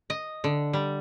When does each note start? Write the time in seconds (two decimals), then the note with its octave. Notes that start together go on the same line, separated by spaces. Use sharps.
0.10 D#5
0.44 D3
0.73 G3